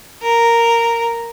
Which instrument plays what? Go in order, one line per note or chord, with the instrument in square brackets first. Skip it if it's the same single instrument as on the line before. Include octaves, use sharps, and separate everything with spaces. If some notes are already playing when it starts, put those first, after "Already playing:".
[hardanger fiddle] A#4